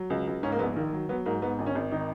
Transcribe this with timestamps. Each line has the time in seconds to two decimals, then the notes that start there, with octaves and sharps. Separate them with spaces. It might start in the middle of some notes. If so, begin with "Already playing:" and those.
Already playing: F#3
0.10 C#2
0.27 C#2
0.43 G#2 C#4
0.52 A#3
0.59 A#1 B3
0.76 D#3 A#3
0.93 F#3
1.09 F#3 B3
1.25 G#2 A#3
1.42 G#2 B3
1.59 G#1
1.66 C#4
1.75 G#1
1.91 D#3 D#4